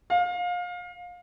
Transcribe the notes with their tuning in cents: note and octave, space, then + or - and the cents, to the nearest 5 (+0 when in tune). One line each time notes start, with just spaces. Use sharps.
F5 +25